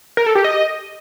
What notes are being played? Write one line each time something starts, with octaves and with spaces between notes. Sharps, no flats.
A#4
A4
G4
D#5